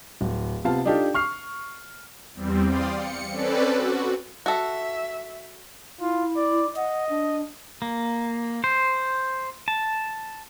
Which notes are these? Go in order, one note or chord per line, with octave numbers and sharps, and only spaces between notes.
D1
C3 B3 F4 F5 A5
D4 D#4 F4 G4 A4
C#6 F6 C7
E2 G3 C4
D5 F5 G5 C6 D#6
C#7
C4 C#4 A4 B4 D5
F#4
F#4 A4 E5
E4 F4
D5
D#5 F#5
D4
A#3
C5
A5